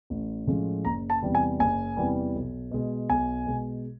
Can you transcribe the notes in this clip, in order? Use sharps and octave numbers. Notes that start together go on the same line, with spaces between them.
A1
A2 F3 G#3 C#4
F#1 A#5
A5
E2 C3 E3 G3
G#5
F#1 G#5
E2 C3 E3 G3
B1
B2 G#3
B1 G#5
B2 G#3